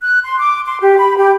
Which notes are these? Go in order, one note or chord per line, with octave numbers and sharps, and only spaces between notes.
F#6
C6
D6
C6
G4
B5
G4